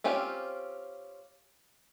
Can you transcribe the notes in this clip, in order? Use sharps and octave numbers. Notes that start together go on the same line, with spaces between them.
C4 C#4 F4 G4